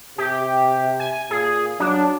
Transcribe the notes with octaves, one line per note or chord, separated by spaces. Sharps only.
C3 G4
G#5
A#2 G#4
F#3 D4